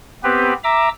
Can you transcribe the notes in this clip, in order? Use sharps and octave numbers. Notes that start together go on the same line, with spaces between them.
B3 C4 G4 B4
E5 A#5 D6 E6